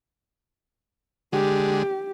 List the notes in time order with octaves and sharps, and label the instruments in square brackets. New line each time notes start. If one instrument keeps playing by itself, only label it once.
[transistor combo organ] D3 G#3 [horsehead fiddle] G4